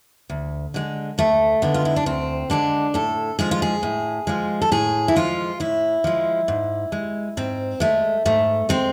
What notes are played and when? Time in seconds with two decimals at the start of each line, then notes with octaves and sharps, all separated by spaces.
0.30 D2
0.74 D3 G#3
1.18 D2 A3
1.62 D3 G#3 B3
1.74 F4
1.85 E4
1.96 D4
2.06 D2 C4
2.50 D3 G#3 D4
2.94 A2 A4
3.39 F3 G#3 G#4
3.51 F4
3.62 G#4
3.83 A2
4.27 F3 G#3
4.62 A4
4.71 A2 G#4
5.08 E4
5.16 F3 G#3 F4
5.60 A2 E4
6.04 F3 G#3
6.48 G#2
6.92 G#3
7.37 G#2 C4
7.80 G#3 A3
8.25 G#2 A3
8.69 G#3 C4